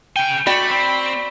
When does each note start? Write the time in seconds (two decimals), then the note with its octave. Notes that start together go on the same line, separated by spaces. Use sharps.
0.16 C#3 G5 G#5
0.46 A3 F#4 D5 G5 B5
0.71 C4